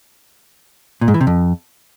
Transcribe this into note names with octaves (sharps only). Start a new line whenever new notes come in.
A#2
G#2
E3
C3
F2